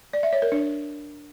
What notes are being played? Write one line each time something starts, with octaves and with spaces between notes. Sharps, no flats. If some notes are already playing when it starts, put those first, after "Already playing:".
D5
E5
C#5
A#4
D4